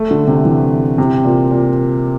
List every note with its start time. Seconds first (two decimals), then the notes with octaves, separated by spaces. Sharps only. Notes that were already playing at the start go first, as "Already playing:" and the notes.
Already playing: A3
0.11 D3
0.27 C3
0.45 E3
0.98 C3
1.25 A#2
1.51 A#2